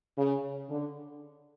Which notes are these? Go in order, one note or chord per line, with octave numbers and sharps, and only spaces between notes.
C#3
D3